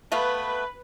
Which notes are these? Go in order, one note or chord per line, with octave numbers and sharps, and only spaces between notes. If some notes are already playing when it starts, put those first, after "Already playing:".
A3 B3 B4 F5